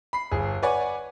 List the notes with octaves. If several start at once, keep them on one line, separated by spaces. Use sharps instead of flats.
B5 C7
G1 G#4
B4 C#5 D5 F#5 G#5